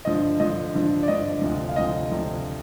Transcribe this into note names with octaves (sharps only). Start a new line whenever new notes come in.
G2 D3 F3 D#5
G2 D3 F3 D#5
G2 D3 F3
D5
G2 D3 F3 D#5
D2 C3 F3
F5
D2 C3 F3 D#5
D2 C3 F3